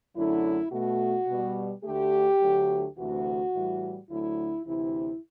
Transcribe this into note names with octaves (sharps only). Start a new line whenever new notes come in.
F#2 D3 F#3 A3 E4
B2 A3 F#4
B2 G3
D2 D3 A3 G4
D2 D3 F#3 A3
D2 C3 E3 A3 F#4
A2 E3 G3
D2 D3 F#3 A3 E4
D2 C3 E3 E4